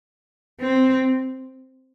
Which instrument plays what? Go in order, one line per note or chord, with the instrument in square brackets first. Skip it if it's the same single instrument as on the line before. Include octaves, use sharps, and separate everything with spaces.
[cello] C4